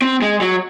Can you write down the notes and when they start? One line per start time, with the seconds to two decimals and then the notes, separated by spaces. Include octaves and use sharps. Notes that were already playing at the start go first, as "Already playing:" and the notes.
0.02 C4
0.22 G#3
0.41 F#3